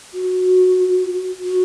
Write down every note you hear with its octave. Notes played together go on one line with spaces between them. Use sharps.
F#4
F#4